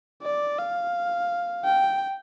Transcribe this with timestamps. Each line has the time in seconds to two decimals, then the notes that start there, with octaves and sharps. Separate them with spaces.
0.23 D5
0.59 F5
1.65 G5